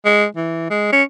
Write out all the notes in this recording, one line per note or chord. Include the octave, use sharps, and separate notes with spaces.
G#3
E3
G#3
C#4